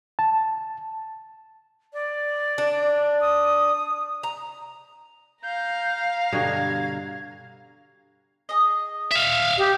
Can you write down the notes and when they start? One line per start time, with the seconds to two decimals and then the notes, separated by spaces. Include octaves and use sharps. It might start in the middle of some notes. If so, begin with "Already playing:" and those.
0.19 A5
1.93 D5
2.58 D4
3.21 D#6
4.23 A#5
5.43 F5 A#5 G6
6.32 G2 B2 D3 G#6
8.49 G#4 D#5
9.12 E5 F5
9.58 G4 D#5